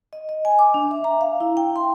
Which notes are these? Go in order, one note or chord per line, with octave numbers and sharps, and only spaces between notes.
D#5
D#5
G#5
D6
D4
E5
A#5
F5
E4
G5
C6